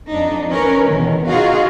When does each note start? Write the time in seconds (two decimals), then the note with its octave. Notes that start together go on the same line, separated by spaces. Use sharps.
0.10 F2 D4 D#4
0.51 C#4 A#4 B4
0.89 E2 B2 D#3
1.27 D#4 F4 F#4 G#4 D#5 F5